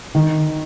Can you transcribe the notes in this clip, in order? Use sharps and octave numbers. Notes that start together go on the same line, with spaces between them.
D#3